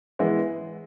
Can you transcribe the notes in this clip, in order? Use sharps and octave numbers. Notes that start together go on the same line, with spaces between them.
E3 G#3 B3 E4